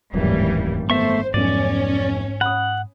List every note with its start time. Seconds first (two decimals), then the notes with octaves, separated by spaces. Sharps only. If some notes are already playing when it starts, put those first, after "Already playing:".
0.14 D#1 G#1 F#2 A2 E3 G3
0.90 A3 B3 C5 E5 C#6
1.34 F1 B1 G#2 C#4 D5 D#7
2.41 F#5 B5 D#6